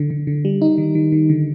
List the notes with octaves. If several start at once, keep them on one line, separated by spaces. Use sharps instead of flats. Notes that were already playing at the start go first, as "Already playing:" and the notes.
Already playing: D3
D3
D3
G3
D#4
D#3
D#3
D#3
D3